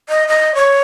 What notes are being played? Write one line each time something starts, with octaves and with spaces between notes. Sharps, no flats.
D#5
D#5
C#5